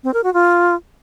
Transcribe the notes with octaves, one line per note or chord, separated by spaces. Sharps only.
C4
A#4
F#4
F4